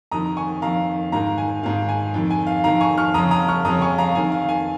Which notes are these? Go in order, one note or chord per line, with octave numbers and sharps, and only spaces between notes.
F2 D#3 A#5 D#6
G#5 C#6
F2 D#3 F5 A#5
G#2 D#3 F5 A#5
G#5
G#2 D#3 F5
G#5
F2 D#3
G#5
F5
F2 D#3 F5 A#5
G#5 C#6
C#6 F6
F2 C#3 A#5 D#6
A#5 D#6
C#6 F6
F2 C#3 A#5 D#6
G#5 C#6
F5 A#5
F2 D#3 G#5
F5
G#5